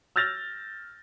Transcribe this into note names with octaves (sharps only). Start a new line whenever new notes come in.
E6 F6 G6 A6 A#6 F7